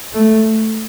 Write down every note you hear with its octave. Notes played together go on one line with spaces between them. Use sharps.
A3